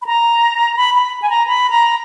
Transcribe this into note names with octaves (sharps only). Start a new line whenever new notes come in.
B5
A#5
B5
B5
G#5
A#5
B5
A#5